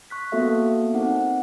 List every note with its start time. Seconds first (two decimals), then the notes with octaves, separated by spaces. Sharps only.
0.10 C#6 F#6 B6
0.32 A#3 B3 F#4 A4 E5 F5
0.94 C4 D#4 A#4 F#5